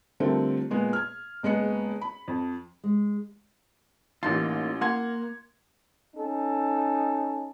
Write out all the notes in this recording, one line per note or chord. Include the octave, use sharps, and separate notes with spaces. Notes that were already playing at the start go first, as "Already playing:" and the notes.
D3 F3 G3 A3 C4 A#4
A#2 G#3 B3
F6 G#6
F#1 G#3 B3 D#5 C#7
B5
F2
G#3
A1 A#3 D#4 F4 C6
A#3 F#5 C6 G#6
C#4 D#4 A4